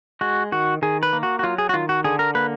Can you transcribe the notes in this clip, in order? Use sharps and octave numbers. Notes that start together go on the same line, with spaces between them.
G#3 F#4
D#3 F#4
D#3 G#4
B4
A#3
F#4
F#4
F#3 F4
G#4
F#4
D#3 F4
F#4
D3 G#4
A#4
A#3 B4